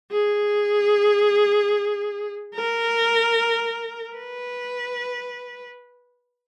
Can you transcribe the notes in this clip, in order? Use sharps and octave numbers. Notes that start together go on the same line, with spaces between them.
G#4
A#4
B4